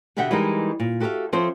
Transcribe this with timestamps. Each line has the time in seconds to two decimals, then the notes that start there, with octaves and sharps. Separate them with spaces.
0.17 B2 D3 G4 E5 F#5 G5
0.31 E3 G3 G#3 D#4 G4 A#4
0.80 A#2
1.00 F#4 G4 A4 A#4 E5 F5
1.33 F3 C4 A4 C5 C#5 E5